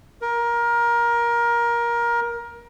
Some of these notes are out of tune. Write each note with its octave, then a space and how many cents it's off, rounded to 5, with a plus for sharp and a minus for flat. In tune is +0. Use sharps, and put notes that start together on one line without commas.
A#4 +20